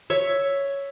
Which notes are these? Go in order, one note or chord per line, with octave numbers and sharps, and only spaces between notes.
C#5 E5